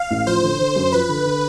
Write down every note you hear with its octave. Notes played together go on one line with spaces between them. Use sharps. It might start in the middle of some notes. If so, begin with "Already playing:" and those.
Already playing: F5
A1
F3 C5
D3
D3
F#2
F3 B4
D3
D3